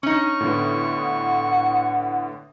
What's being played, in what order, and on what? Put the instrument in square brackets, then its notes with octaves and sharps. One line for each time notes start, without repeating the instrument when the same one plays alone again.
[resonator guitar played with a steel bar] C#4 D#4 [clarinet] C#6
[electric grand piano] A2 D3 B3
[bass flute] F#5